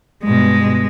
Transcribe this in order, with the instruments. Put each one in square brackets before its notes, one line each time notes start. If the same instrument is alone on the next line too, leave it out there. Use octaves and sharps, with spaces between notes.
[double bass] G2 B2 [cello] G#3